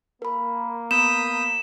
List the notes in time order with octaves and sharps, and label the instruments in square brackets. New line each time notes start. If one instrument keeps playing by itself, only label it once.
[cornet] A#3 [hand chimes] A#4 B5
[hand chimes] B3 [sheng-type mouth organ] B5 D#6 G6 [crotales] E7